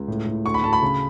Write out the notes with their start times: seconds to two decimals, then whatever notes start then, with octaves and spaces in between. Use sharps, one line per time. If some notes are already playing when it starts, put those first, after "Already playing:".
Already playing: C#2
0.08 A2
0.27 A2
0.45 D2 C#6
0.54 B5
0.63 D2 A5
0.73 B5
0.82 C#3